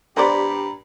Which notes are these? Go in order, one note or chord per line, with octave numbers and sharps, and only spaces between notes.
G2 B3 G4 C5 D5 A#5 B5